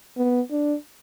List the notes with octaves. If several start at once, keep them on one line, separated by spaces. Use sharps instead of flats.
B3
D4